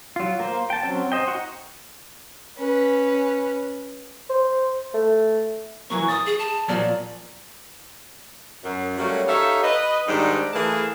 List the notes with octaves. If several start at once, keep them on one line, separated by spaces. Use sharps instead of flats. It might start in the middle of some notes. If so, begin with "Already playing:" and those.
F#3 F4
A#3 C5
G5 A5
F#3 C4 C#4
C5 D#5 G5
D#4 F#4
C#4 B4
C5
A3
E3 F#3 A#3 C#6
D#6 A6
G#4
A5
A#2 F3 F#3 D5
F#2
F#3 G3 A3 A#3 C#4
D#4 G4 A4 C#5 E5 F5
B4 D#5
G#2 D#3 G3 D4 D#4
E3 A3 A#3 E4 G#4 A5